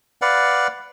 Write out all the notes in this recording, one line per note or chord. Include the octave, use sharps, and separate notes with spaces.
B4 D5 F5 F#5